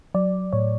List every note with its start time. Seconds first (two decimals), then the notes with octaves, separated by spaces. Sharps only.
0.14 F#3 D5
0.53 A2 C#5